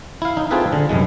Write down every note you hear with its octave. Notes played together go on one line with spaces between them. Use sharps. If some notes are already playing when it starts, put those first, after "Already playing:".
E4 F5
D#4
C4 F4 G#4 A4 B4 E5
D3
C2 F#2 E3 G#3